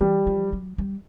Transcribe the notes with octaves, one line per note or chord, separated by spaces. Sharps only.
E3 G3
F3
F#3
G3